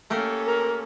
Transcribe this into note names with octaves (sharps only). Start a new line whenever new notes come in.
A3 A#3 C#4 G4 A4
A#4